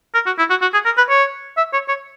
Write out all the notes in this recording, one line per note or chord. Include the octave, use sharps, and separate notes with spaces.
A#4
F#4
E4
F#4
F#4
G#4
A#4
B4
C#5
E5
C#5
C#5